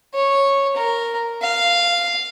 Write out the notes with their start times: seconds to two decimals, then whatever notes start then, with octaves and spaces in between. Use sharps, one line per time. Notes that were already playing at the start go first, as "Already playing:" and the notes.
0.14 C#5
0.76 A#4
1.42 F5